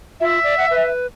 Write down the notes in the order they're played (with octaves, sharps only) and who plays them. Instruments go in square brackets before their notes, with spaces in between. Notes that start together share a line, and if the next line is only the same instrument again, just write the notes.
[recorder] F4 [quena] E5
[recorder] D5
F#5
B4